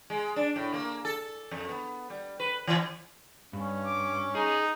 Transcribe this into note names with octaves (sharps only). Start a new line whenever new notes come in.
G#3
D4
A2
A#3
A4
F2
B3
G3
B4
E3
G2 C#4
D6
D#4 G#4